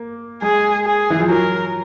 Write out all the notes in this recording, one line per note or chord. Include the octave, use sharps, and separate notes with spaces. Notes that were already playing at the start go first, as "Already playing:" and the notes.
Already playing: A#3
G#3 G#4
G#4
E3
F3
F#3 A#4